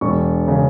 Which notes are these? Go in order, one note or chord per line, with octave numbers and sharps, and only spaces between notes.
E1 C#6
C#3